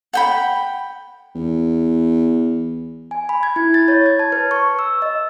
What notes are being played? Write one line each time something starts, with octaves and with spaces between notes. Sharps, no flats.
F#5 G5 B5
E2
G#5
B5
G#6
E4
A6
C#5
G#6
A5
B4
C#6
E6
D#5